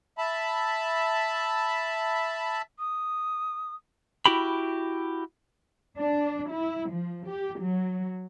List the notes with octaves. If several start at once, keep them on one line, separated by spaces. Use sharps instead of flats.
E5 A5 B5
D#6
E4 F#4 G4 B5
D4
E4
F3
G4
F#3